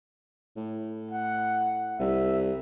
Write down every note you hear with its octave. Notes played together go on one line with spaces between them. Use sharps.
A2
F#5
C2 E5